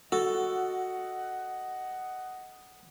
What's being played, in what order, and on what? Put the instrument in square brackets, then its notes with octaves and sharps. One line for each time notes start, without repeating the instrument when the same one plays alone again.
[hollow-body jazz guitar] F#4 [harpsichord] A4 [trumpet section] D#5 F#5